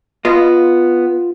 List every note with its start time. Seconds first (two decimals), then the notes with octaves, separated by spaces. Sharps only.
0.25 B3 F4 D#5